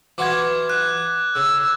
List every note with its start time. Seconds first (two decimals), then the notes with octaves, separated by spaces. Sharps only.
0.18 E3 F4 F#4 D6 G#6
0.70 F#6
1.36 C#3 E6